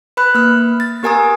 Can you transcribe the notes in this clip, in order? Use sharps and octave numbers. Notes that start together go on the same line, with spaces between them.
B4 B5 F#6
A#3 F6
A6
B3 G4 A#4 G#5 A#5 D#6